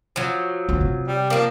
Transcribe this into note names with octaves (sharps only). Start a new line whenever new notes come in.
F3 F#3
D2
C3
G3
F3 A#3 D4